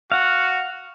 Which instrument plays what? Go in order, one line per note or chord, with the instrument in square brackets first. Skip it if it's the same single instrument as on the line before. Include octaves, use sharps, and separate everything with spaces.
[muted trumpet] F#4 [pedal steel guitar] F5 F#5